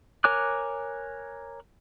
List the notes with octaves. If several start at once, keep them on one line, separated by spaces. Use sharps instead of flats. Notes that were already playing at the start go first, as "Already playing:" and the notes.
A#4 C#5 G#5 D6 F#6